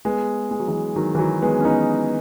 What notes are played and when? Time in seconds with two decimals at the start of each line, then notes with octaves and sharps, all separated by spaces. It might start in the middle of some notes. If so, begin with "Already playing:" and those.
0.05 G#3 B3
0.51 G#3
0.60 F#3
0.68 E3 G#3
0.96 D#3 F#3
1.15 E3
1.19 D#3 F#3
1.42 G#3 B3
1.60 C#4
1.65 B3 D#4